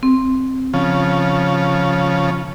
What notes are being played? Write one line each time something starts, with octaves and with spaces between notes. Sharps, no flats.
C4
C#3 F3